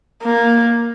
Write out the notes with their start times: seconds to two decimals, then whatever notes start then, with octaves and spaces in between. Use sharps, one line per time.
0.23 A#3